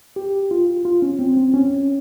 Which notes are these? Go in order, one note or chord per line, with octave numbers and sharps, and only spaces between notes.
G4
F4
F4
C#4
C4
C4
C#4